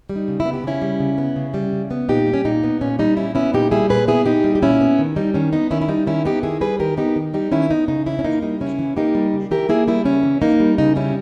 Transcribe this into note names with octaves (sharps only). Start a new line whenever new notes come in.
G3
D#4
C#3
E4
B3
G4
C#3 C#4 E4
G3
C#3
B3
C#3
G3
C#3
B3
A#2 D#4 G4
G3
C#4
A#2 D#4
B3
A#2 C#4
G3 D#4
A#2 C#4 E4
B3 C#4 E4
A#2 D#4 G4
G3 E4 G#4
A#2 G#4 B4
B3 E4 G#4
A#2 D#4 G4
G3
G4
A#2 C#4 E4
B3
D#3
G3 D#4
D#3 C#4
B3 D#4
D#3 C#4 E4
E4
G3 D#4
D#3 C#4 E4
B3 D#4 G4
D#3 E4 G#4
G3 G#4 B4
D#3 G4 A#4
B3 D#4 G4
D#3
G3 D#4 G4
D#3 C#4 E4
B3 D#4
C#3 D#4
E3 C#4 E4
C#4
A#3 D#4
G3 D#4
C#3 C#4 E4
E3
A#3 D#4 G4
G3
C#3
E3 G4 A#4
A#3 E4 G#4
G3 E4 G#4
C#3 C#4 E4
E3
A#3 D#4
G3
C#3 D#4
G3 C#4 E4